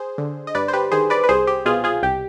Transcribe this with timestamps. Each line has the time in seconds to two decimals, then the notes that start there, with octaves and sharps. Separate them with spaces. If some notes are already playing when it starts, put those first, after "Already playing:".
Already playing: G#4 C5
0.18 D3
0.47 D#5
0.55 G2 B4 D5
0.68 C5
0.73 G4 B4
0.92 D#3 G#4 C5
1.10 B4 D5
1.24 B4
1.29 C2 G#4 C5
1.47 G4
1.65 B2 F4 G#4
1.84 F4 G#4
2.03 C2 G4